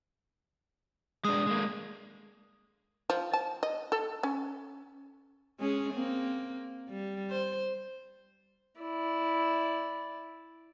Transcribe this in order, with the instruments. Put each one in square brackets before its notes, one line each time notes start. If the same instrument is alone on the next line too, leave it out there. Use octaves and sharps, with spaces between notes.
[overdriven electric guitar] G#3 D4 [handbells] D#6
[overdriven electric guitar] G#3 A#3
[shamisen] F3
A5
D#5
A4
C#4
[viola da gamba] G#3 C#4 G#4
A#3 C4
G3
C5
[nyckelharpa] E4 D5